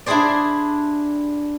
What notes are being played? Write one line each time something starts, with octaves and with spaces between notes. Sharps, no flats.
D4 E4 G4 G#4 C5 D5